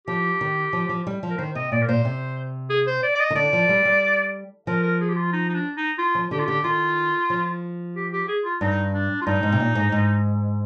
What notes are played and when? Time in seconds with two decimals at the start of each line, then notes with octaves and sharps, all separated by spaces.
0.07 F3 G4
0.41 D#3
0.73 F3
0.89 F3
1.07 G3
1.23 F3
1.30 A#4
1.39 D#3 C5
1.55 C3 D#5
1.72 A#2 D5
1.82 A#4
1.88 A#2 C5
2.05 C3
2.70 G#4
2.87 C5
3.03 D5
3.15 D5
3.20 D#5
3.30 D#3
3.36 D3 D5
3.53 F3
3.69 G3
3.85 G3
4.67 F3 A#4
4.83 A#4
5.01 G#4
5.08 G4
5.17 F4
5.33 D#4
5.49 D#4
5.54 D4
5.77 D#4
5.98 F4
6.15 F3
6.31 D3 G4
6.40 F4
6.46 D3 G4
6.64 D#3 F4
7.30 F3
7.96 G4
8.12 G4
8.28 G#4
8.45 F4
8.61 G2 D#4
8.94 D4
9.21 F4
9.26 G2 D#4
9.43 G#2
9.52 C3
9.60 A#2
9.75 G#2
9.92 G#2